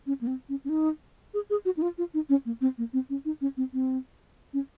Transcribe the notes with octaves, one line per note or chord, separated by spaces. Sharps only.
C#4
A#3
C4
C#4
C#4
D#4
G#4
G#4
F#4
D#4
F4
F4
D#4
C#4
A#3
C4
A#3
C4
C#4
D#4
C#4
C4
C4
C#4